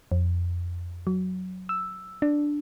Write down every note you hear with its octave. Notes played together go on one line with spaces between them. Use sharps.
F2
F#3
E6
D4